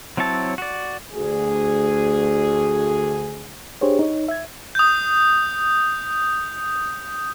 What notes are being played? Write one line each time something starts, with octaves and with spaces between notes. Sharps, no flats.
F#3 C4 E4 C#5 A5
F#4 D5
D2 G#4
D4 G4 G#4 C5 C#5
D#4 C#5
E5 G#6
D#6 G6